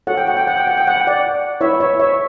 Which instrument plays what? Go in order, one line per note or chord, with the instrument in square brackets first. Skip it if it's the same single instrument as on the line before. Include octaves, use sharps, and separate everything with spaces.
[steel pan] F#4 A4 C#5 F#5
G5
F#5
G5
F#5
G5
F#5
G5
F#5
G5
D5 F#5
E4 B4 C#5 E5
C#5 E5
C#5 E5